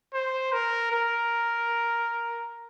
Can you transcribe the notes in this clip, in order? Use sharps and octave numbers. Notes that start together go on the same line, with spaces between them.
C5
A#4
A#4